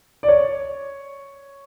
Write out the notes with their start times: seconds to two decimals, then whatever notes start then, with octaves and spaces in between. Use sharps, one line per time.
0.23 D5
0.28 C#5